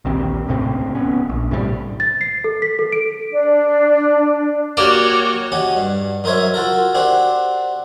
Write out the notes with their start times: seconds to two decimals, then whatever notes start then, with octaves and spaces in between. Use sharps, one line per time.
0.05 A#1 D#2 C4
0.48 C#2 A2 C3 C4
0.95 D1 B3 C#4
1.29 A#1
1.51 A2 C3 G3
2.00 A6
2.21 C7
2.44 A4
2.62 B6
2.79 A4
2.92 D7
3.30 D4
4.77 A#3 F#4 G4 C#5 D5
5.52 C#4 D#4 F#4 G4
5.76 G2
6.24 F#2 D#4 A#4 C5 C#5 E5
6.54 F4 F#4 A4 A#4
6.94 C4 D4 F#4 G4 C5